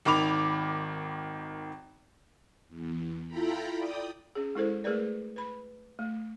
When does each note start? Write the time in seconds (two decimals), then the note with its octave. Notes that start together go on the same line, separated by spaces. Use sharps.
0.05 G#1 D#3 B5 D6 F7
2.68 E2
3.27 E4 F4 A4 G5 A#5 B5
3.78 D5 G5 D#6
4.35 C#4 G#4
4.55 G#3 E4 A4 C5
4.84 A3 G#4 A#4 B4 D5
5.36 B4 B5
5.99 A3